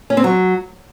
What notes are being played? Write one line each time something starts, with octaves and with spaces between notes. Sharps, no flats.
C#4
C4
F#3